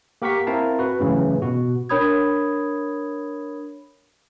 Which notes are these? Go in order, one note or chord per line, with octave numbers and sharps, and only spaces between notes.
A#3 G4 A#4 F#5 C#6 B6
C4 E4 A#4 F5 A5
F#4 B4
F#2 A2 C#3 E3
B2 F#4
D4 A#4 C#5 B5 D#6 G#6